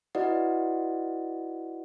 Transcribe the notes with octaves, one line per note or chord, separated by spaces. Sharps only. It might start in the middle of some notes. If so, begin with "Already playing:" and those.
E4 F#4 B4 D5 D#5 F#5